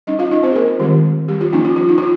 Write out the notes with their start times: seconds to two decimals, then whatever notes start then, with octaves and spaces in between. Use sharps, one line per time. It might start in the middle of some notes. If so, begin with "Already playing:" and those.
0.07 G3 C#4 D#4 D#5
0.19 F4 F5
0.31 D#4 D#5
0.43 C4 C5
0.52 G#4
0.55 A#3 A#4
0.67 F4
0.79 D#3 G3 G#3 C4 G4
1.28 G3 G4
1.41 F4
1.53 F3 A#3 C#4 D#4
1.65 F4
1.76 F4
1.89 D#4
1.98 F4